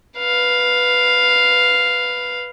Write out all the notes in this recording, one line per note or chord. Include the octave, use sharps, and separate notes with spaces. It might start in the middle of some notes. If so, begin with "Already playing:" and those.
B4 F5